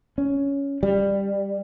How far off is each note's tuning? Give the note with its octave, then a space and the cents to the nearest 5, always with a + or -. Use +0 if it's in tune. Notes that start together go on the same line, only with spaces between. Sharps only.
C#4 +10
G3 +15